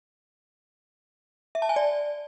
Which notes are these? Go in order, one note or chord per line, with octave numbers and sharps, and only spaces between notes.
E5
A5
G#5
D5